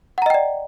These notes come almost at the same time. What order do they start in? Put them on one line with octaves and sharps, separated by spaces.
F#5 A#5 D#5 G5 D5